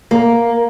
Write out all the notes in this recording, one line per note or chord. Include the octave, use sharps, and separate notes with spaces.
A#3